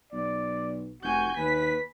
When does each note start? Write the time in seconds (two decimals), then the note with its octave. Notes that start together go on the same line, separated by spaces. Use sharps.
0.12 B1 D5
1.03 F1 F#4 G#5 G6
1.37 D#2 B4 B6